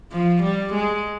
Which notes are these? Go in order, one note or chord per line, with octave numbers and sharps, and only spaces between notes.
F3
G3
G#3